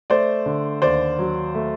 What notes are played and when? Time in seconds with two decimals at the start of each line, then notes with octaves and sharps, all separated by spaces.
0.10 A3 C5 D5
0.46 D3
0.82 D#2 C5 D5
1.19 F#3
1.55 A3